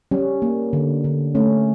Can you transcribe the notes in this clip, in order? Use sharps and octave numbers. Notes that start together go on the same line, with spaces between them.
G3 C#4
A#3
D3
D3
A3 C#4